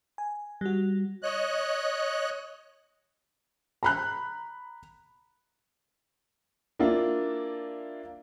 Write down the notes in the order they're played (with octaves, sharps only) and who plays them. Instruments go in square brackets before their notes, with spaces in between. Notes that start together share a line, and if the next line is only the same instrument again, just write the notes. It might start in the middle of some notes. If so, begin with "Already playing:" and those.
[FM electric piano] G#5
G3 F#4
[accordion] C#5 D#5 F#6
[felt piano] A#5 B5 F#6
[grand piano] A#3 D4 E4 F4